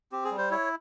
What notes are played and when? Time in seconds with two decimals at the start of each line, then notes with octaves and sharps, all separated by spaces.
0.12 C4 G4
0.25 G#4
0.31 G3
0.38 C5
0.51 E4 C#5